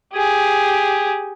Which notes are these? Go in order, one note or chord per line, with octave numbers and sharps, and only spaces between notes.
G4 G#4